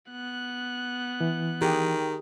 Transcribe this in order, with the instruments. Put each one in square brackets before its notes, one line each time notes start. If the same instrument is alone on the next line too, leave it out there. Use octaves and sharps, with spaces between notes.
[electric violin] B3 F#6
[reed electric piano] E3
[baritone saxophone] D#3 [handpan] G4 G#4